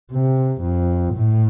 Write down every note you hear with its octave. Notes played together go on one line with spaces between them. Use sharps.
C3
F2
A2